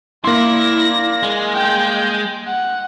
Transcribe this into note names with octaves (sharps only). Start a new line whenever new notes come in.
A#3 E4 D5 C6 A#6
G#3
G5 G6
F#5